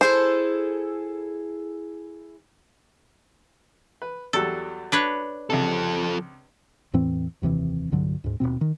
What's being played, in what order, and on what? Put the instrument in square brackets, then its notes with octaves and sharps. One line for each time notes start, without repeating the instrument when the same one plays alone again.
[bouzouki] E4 G#4 A4 [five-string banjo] C5
[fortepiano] B4
[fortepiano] E2 F#3 G3 [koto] A4
[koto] D4 B4 C#5
[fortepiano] C#2 C3 [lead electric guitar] F3 A4
[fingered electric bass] E2 A2 E3 C4
F1 D#2 C3 E3
C2 G2 D3 F#3
D2 G#2
D#1 C#2 B2 C4
D#3